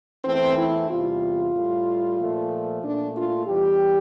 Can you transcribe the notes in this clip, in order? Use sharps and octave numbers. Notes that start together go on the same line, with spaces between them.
E2 E3 A3 C4
E4
E2 C3 G3 F4
A2 G3
A#2 F3 A3
A#2 A3 D4
F4
E2 E3 G3 G4